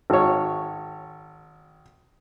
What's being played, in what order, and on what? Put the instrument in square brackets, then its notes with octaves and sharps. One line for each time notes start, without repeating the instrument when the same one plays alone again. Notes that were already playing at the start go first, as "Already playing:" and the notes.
[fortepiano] G#1 C#5